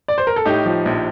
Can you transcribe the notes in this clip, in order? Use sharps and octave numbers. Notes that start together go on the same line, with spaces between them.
D5
C5
A#4
A4
A2 D#4 G4
F3
A#1